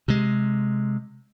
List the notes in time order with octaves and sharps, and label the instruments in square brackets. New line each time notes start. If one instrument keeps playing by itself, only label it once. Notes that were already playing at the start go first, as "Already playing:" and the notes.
[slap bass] C3 G#3